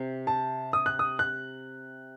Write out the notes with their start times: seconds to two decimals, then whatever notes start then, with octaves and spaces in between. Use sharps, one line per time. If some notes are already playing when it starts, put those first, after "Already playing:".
Already playing: C3
0.27 A5
0.73 D#6
0.86 F#6
0.99 D#6
1.19 F#6